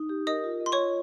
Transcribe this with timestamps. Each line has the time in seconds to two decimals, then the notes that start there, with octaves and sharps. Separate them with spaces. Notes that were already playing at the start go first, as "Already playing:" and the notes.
Already playing: D#4
0.09 G4
0.27 A#4 D#5 D#6
0.44 F4
0.60 D#5
0.66 C6
0.72 C#5 C#6
0.78 F4